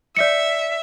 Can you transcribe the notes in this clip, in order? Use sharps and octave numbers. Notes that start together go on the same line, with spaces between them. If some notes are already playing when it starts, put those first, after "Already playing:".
D5 E5 C#7